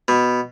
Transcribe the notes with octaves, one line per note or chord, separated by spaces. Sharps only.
B2